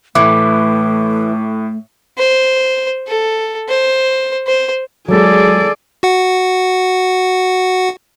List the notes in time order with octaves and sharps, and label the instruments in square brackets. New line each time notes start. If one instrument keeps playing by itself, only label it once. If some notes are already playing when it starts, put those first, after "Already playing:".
[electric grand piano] A2 [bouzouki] E3 [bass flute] A3 [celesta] D6
[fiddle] C5
A4
C5
C5
[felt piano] F#3 G#3 [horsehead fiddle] G#4 D5 [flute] A4
[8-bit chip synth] F#4 F#5